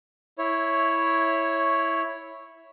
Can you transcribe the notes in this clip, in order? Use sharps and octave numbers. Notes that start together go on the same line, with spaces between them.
E4 C#5